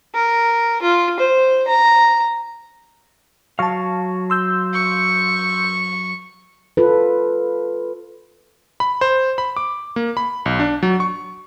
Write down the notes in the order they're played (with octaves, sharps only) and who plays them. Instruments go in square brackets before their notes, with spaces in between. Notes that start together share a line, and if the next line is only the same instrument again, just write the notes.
[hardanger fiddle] A#4
F4
C5
A#5
[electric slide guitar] F#3 F5 [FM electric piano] A5 C#6
[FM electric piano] C6 E6 G6
[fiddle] C#6
[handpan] F4 A4 B4
[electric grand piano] B5
C5
B5
D6
A#3
B5
B1
D4
F#3
C#6